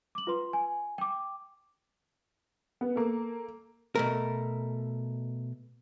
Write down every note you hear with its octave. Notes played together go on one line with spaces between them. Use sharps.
D6 F#7
F4 B4 C6
G#5
G5 D6
B3
A#3 A4
B2 A3 A#4